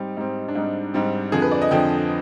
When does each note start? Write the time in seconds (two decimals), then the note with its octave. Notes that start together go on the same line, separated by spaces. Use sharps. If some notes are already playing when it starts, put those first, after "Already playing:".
Already playing: G#2 G3 C4 D#4
0.17 G#2 G3 C4
0.48 D4
0.55 G#2 G3 C4 D#4
0.94 G#2 G3 C4
1.32 F2 D3 F3 G#4
1.42 B4
1.51 D5
1.62 D#5
1.71 F2 D3 F3 G5